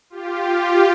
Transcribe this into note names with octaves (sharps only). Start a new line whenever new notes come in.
F4 G4